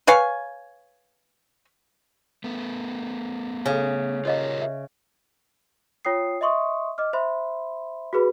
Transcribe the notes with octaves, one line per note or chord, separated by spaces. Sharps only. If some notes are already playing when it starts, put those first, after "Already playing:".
B4 C#5 F5 G#5
A3 B3
C#3 A4 F5 G#5
F4 G4 A#4 C#5 D#5 F5
E5
F4 C#5 G5 D#6 C7
D#5 E5 C6 C#6 D#6
D#5 D6 F6
C5 E5 B5 C6
F#4 G#4 B4 B5